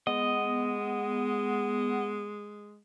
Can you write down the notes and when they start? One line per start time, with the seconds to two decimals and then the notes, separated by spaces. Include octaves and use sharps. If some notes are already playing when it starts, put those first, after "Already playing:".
0.07 G#3 B3 D#5